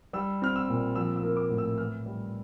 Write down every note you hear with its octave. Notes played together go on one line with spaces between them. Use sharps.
G3 E6
C4 F6
E6
A#2
F3 E6
E6
A#3
D6
A2
E6
E3 F6
G3